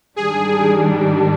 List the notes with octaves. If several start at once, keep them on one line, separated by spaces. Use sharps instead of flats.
G#2 D#3 G3 D4 G#4